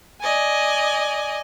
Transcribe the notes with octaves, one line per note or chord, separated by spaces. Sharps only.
D5 D#5 G#5